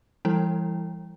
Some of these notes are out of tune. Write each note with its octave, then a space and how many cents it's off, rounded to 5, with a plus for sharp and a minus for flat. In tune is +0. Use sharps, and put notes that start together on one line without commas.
E3 +40 G3 +35 E4 +0